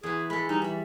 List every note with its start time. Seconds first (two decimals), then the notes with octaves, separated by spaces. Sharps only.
0.03 E2 G#4 B4
0.30 G#3 A4 B5
0.49 G3 D#4
0.62 E3 E5 B5